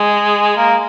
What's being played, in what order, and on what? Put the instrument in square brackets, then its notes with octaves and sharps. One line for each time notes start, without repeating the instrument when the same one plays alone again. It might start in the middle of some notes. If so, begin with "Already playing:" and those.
Already playing: [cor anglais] G#3
A#3